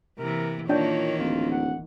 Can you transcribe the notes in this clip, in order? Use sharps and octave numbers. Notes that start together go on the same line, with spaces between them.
C3 E3 A#3 A#4
A#2 D#3 E3 A#3 D4 C#5 G5
D1 F4
F#5